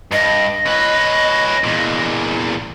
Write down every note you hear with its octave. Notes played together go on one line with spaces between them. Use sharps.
G2 D#5
C#4 B4
E2 A#2